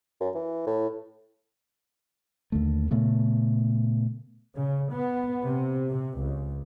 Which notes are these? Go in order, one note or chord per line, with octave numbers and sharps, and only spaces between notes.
F#2
E3
A2
D#2 D3 A3
A#2 C#3 A3 B3
C#3
B3
C3
C3
C#2